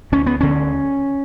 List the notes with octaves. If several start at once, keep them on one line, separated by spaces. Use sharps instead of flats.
D2 C#4
B3
D3 C#4